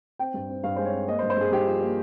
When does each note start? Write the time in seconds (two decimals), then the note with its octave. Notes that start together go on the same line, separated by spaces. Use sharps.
0.19 C4 G5
0.34 G2
0.49 C4
0.64 G2 F5
0.76 G#3 C5
0.85 C#5
0.93 C4
1.08 A#3 D#5
1.19 C5
1.23 G2
1.30 C5
1.37 G2 G#4
1.52 G2 G4
1.67 F3
1.81 A#3